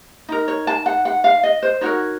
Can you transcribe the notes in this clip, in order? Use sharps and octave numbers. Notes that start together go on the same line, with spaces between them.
D#4 A#4
C#5
A5
F#5
F#5
F5
D#5
C5
D#4 F#4 A#4 C#5